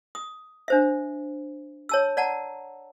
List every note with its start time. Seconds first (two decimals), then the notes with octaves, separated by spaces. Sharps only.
0.15 D#6
0.68 D4 C5 E5
1.89 C#5 A5 E6
2.17 D5 F#5 A5 A#5